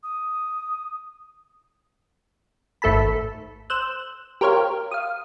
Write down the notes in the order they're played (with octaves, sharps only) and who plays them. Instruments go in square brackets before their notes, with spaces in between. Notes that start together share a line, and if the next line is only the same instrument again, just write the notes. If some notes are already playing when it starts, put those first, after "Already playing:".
[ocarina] D#6
[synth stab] G#1 A3 A4 A5 B5
C5 E6 F#6
G4 A#4 C5 C#5 F5
F5 D#6